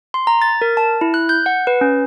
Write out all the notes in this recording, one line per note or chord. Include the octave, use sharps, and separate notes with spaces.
C6
A#5
A6
A#4
A5
E4
F#6
G6
F#5
B4
C#4